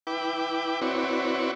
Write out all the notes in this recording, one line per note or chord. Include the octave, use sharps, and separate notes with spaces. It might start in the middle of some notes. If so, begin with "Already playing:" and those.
E4 B4 G5 D6
C4 E4 F#4 B4 C#5 D5